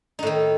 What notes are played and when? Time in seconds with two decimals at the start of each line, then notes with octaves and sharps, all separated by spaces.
0.19 D#4
0.23 A2
0.27 D#3